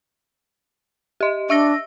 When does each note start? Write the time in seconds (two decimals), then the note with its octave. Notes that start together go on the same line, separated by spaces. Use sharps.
1.20 G4 D#5
1.50 D4 E5 E6 A#6